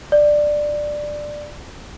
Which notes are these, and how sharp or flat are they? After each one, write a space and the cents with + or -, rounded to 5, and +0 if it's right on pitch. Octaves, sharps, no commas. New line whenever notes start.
D5 +10